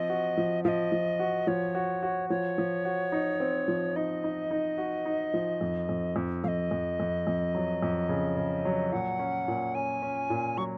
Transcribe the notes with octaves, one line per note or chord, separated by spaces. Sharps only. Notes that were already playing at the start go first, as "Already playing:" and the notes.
Already playing: F3 C4 D#5
F#4
F3
F3 D#5 F5
F3
F#4
F3 C#5
F#4
F#4
F3 C#5
F3
F#4
D#4
C4
F3
D#4 D#5
D#4
D#4
F#4
D#4
F3
F2
F2
F2
F2 D#5 F5
F2
F2
F2
F#3
F2
C#3
C#3
F#3
A#2 F#5
C#4
A#2
C#4 G#5
C#4
A#2
F#3 C#6